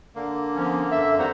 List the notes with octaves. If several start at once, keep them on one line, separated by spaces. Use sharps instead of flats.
D3 A#3
F3 B3 C#4
F#2 A4 E5
D#3 G3 C4 F#4 C5 A#5